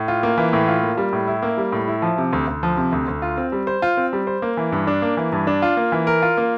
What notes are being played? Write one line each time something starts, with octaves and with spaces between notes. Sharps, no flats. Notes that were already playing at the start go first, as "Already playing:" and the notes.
Already playing: A2
F4
A#3
E3
A2
F4
A#3
G3
A2
E4
A#3
G3
A2
E4
F3
C3
D2
D2
F3
C3
D2
D2
F4
C4
G3
C5
F4
C4
G3
C5
A#3
E3
G2
D4
A#3
E3
G2
D4
F4
A#3
E3
A#4
F4
A#3